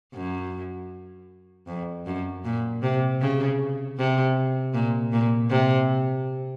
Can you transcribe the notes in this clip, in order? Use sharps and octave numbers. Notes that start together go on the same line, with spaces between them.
F#2
F2
F#2
A#2
C3
C#3
C3
A#2
A#2
C3